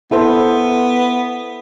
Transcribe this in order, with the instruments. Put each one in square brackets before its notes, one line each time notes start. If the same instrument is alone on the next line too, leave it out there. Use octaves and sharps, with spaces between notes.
[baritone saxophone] B3 [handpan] E4 A4 C5